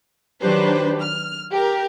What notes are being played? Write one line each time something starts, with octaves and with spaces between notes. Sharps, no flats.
D#3 F#3 D4 G4 B4 C5
F6
G4 A#4